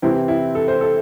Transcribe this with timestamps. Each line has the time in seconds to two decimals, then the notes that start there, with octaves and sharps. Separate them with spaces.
0.02 C3 E3 C4 E4
0.28 E4
0.55 A4
0.68 C5
0.81 A4